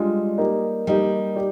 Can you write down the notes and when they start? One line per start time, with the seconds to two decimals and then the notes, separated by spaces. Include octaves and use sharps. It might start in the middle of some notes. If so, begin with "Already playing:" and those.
Already playing: G3 G#3 D4 F4
0.38 A#3 D#4 G4
0.87 G3 A#3 D#4 G4
1.36 G4 D5